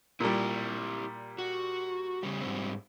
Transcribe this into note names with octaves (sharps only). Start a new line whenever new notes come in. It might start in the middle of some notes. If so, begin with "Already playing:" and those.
A#2 G3 E4 G4
F#4
C#3 G3
G#2 G3 C4